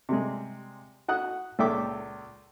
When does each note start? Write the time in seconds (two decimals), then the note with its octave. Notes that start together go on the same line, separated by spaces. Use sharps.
0.09 C3 G3 G#3
1.08 F#4 F#5 D#6 F#6
1.59 C#2 A#2 A4 E5 G5 D6